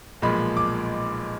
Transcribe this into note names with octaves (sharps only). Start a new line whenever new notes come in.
B1 A#2 F3 G#3 B5
D6